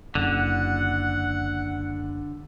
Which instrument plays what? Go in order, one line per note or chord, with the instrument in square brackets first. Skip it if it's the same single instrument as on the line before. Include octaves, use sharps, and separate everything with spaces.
[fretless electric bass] F#1 [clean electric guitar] D3 [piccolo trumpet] F#5